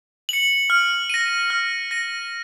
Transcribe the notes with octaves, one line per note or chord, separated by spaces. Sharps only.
C#7 F#7
F6
A#6 D#7
F6
A#6 D#7